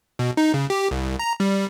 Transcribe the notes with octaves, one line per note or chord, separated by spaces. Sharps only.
B2
D#4
C#3
G4
C2
A#5
G3